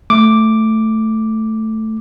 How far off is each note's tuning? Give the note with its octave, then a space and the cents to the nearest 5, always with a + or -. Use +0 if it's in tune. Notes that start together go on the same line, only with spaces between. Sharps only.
A3 +0 D6 +0